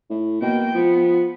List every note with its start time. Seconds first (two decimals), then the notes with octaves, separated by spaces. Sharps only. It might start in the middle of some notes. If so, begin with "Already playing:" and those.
0.10 A2
0.41 B2 A#3 G5
0.75 F3 B3